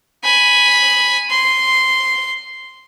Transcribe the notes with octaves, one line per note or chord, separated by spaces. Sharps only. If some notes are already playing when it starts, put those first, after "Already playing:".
G#5 B5
C6